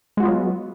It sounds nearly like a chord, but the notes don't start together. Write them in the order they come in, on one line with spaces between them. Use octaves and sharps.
G#3 F#4 F4 B3 F#3